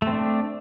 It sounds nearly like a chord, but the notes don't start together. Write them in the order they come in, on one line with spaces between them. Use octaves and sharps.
A3 C4 D4